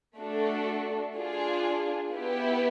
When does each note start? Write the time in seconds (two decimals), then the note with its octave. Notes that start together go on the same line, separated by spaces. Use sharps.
0.17 A3 D4 F#4 A4
1.15 D4 F4 G#4
2.12 B3 E4 G4